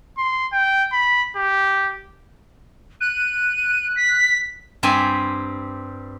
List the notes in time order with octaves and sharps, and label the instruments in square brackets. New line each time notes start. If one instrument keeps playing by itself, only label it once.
[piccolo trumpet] C6
G5
B5
G4
[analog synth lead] F#6 [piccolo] D#7
[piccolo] B6
[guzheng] G2 G3 C4 G#5 B5